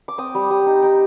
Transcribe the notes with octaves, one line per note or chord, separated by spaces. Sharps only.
D6
C4 D#6
G3
G3 D#6
D#4
D#4 G5